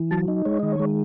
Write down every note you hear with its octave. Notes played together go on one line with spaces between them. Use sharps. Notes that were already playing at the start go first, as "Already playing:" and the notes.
Already playing: E3
F#3 A5
D#4
G#3 C#5
D#3 D#5
C#5
G#3